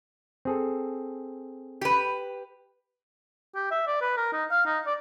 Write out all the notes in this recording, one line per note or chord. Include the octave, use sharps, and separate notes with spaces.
C4 G#4 A4
G4 B4
G4
E5
D5
B4
A#4
D#4
F5
D#4
D5